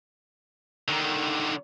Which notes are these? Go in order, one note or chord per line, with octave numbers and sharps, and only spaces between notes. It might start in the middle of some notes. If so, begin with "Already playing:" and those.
D3 D#3